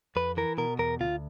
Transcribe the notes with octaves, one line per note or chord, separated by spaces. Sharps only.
F2 B4
E3 A#4
B2 A#4
E2 A#4
D2 F4